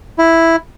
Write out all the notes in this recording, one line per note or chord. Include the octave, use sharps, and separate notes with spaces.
E4